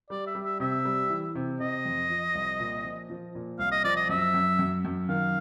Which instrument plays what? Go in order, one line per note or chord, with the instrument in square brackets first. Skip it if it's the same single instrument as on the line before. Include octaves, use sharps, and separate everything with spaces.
[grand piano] G3 [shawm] D5
[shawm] E5
[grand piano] G3
[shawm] E5
[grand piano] C3 [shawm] E5
[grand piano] G3
E3
C3
[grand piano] C3 [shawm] D#5
[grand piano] F2
F3
C2
A#2
F3
F3
A#2
[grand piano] C2 [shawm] F5
[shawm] D#5
[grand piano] F3 [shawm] D5
[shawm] D#5
[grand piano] F#2 [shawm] E5
[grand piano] F#2
F#2
F#2
[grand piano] D#3 [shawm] F5